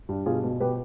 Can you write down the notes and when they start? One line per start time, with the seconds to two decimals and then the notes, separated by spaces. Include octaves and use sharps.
0.09 G2
0.26 B2 F4 G#4
0.44 B2
0.60 B2 G4 B4